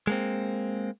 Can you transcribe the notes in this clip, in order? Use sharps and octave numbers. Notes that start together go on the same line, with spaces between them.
G#3 A#3 C4